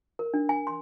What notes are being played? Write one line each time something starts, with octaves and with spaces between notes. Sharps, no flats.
A#4
D4
G#5
C6